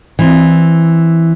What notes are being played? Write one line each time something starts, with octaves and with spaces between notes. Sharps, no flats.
E3 C4